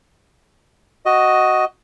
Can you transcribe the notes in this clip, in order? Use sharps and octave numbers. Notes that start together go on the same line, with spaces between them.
F#4 D#5